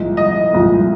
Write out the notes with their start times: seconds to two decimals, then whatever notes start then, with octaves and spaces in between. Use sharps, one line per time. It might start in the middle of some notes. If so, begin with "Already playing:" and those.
Already playing: C2 A#2 F3 G#3
0.17 D#5
0.53 C2 A#2 F3 G#3